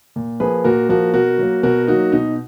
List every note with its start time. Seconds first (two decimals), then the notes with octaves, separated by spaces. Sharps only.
0.16 A#2
0.40 F3 A#3 G#4 B4
0.64 A#2 F#4 A#4
0.89 F3 A#3 F#4 A#4
1.14 B2 F#4 A#4
1.38 F#3 A#3
1.63 B2 F#4 A#4
1.87 F#3 A#3 D#4 F#4
2.12 B2 D#4